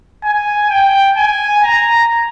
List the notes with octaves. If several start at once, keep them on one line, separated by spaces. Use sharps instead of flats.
G#5
G5
G#5
A#5